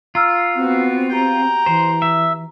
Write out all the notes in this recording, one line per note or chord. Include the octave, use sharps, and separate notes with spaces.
F4 A#5 E6 F6
B3 C4 F#4
G4 G5 A#5
E3 C5
E5